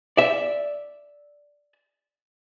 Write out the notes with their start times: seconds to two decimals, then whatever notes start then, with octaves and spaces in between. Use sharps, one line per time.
0.17 D5 E5